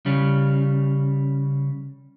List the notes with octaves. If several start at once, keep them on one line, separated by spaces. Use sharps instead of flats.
C#3 G3